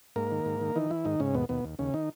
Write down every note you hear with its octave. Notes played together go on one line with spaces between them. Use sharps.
G#2 A#3 A#4
D#3
G#2
D#3
D#3 E3 D#4
E3 E4
G#2 D#3 D#4
G#2 C#3 C#4
D#2 B2 B3
D#2 B2 B3
D#2
D#2 C#3 C#4
D#3 D#4